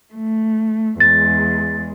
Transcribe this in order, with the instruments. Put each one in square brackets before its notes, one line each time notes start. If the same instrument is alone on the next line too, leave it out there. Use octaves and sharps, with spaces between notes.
[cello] A3
[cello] E2 G#3 [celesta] A6